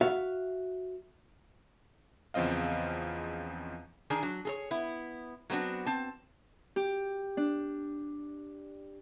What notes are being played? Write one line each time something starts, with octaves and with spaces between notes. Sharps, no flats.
F#4 E5 F5
E2 C#3 F3 C4 D#5 F5
D#3 D4 G#4 G#5
F#3
G#4 A4 C#5
B3 E4
F#3 B3 C4 D4 F#4
C4 A5
G4
D4